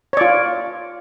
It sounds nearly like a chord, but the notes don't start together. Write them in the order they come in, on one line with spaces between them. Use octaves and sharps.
C#5 D5 F4